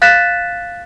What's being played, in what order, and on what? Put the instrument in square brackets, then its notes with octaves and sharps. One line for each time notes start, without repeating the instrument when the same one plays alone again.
[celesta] F5 F#6 A6 B6 E7